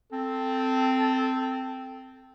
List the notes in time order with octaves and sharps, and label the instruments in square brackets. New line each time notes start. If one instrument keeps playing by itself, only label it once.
[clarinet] C4 [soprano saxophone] A4